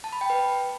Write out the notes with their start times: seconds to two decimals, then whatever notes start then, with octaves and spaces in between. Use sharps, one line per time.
0.04 A5
0.13 B5
0.21 G5
0.30 B4